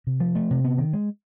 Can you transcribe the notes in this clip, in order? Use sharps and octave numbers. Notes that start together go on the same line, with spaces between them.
C3
F3
A3
C3
B3
D#3
G#3